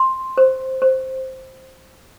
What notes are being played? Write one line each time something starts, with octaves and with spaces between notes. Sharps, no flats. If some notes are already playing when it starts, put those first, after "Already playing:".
Already playing: C6
C5
C5